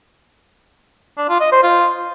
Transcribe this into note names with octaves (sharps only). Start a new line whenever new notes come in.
D4
F4
D#5
C5
F4